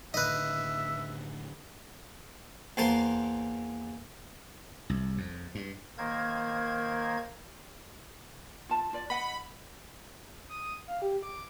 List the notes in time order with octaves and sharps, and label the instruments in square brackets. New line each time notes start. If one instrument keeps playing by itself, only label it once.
[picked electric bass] A2 D3 D#3 [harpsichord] B4 D#5 [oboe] E5
[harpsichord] E2 A#3 C5 A5 A#5 C6
[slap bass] C2
F2
G2
[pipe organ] D#3 A#3 A#4 C5 G#6
[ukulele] F4 A5
F4 D5
[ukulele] D#5 F#5 [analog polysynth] B5
[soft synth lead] D#6
F5
G4
D6